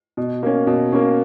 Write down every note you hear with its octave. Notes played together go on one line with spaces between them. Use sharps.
B2
A#3 C#4
B2
A#3 C#4